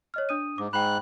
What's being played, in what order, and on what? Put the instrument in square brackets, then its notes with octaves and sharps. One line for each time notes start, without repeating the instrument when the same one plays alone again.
[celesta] C#5 D#5 F6
D4 D#6 D#7
[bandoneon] G#2 [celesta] D6
[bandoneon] G#2 F#6 [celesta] G5 B5